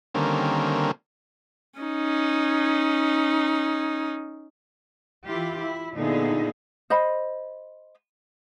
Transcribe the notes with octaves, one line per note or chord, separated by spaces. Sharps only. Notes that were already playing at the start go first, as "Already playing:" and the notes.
D3 D#3 G3 A#3 C4 C#4
C#4 D#4
E3 E4 F4 G4
E4
A#2 D3 B3 D#4 E4 G#4
C5 D#5 B5